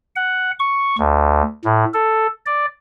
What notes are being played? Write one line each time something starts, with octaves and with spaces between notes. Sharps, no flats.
F#5
C#6
D2
A2
A4
D5